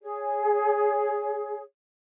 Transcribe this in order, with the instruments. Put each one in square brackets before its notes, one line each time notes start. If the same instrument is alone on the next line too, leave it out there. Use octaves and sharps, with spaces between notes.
[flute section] G#4 C#5